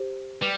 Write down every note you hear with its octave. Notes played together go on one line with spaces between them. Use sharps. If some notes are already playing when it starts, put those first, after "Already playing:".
Already playing: G4 C5
G3 B4